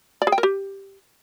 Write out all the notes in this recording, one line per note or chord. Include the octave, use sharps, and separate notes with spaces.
D5
G#4
G5
A#4
G4